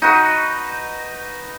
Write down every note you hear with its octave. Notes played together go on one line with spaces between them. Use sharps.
D#4 F#4 B4